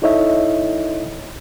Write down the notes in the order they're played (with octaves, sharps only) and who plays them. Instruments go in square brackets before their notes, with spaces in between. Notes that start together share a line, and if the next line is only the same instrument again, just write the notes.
[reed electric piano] D#4 E4 A4 C#5 D#5 E5